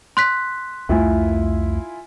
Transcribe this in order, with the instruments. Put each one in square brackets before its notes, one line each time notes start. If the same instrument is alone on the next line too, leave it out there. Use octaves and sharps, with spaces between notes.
[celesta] C6 F#6 B6
[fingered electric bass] C2 F2 A3 [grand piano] E4 F4 G#5